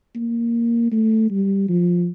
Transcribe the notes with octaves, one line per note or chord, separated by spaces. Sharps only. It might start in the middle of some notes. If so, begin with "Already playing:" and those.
A#3
A3
G3
F3